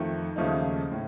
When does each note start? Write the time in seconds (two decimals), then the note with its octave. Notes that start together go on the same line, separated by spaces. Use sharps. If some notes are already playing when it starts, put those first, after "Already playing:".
Already playing: F2 D#3 A3
0.36 D#2 C#3 F3 A3 D#4
0.92 A2